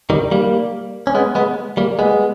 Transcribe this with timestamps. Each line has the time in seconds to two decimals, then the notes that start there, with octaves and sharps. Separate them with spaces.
0.10 D#3 G3
0.31 G3 A#3
1.07 C#4
1.15 G#3 B3
1.35 G#3 B3
1.77 G3 A#3
1.99 G#3 B3